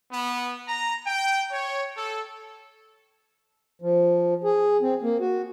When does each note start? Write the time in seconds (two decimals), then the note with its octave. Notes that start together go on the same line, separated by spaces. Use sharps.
0.12 B3
0.67 A#5
1.07 G5
1.52 C#5
1.96 A4
3.82 F3
4.44 G#4
4.82 C4
5.02 A#3
5.20 F#4